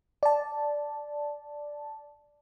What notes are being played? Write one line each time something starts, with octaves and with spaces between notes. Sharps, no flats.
D5 A5